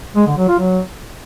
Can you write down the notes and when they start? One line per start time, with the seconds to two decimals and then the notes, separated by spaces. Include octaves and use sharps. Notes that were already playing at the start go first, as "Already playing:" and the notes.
0.16 G#3
0.26 D3
0.37 F#3
0.48 F4
0.59 F#3